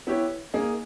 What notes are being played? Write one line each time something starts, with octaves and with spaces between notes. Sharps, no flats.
B3 E4 G4 C#5
A#3 D#4 G#4